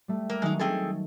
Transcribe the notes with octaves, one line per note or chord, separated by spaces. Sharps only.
G3 A3
A#3 E6
D#3 F#3 G#3 C#4 D#4
C4 G#4 A4